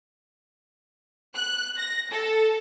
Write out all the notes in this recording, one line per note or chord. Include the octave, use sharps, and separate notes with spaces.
F#6
A#6
A4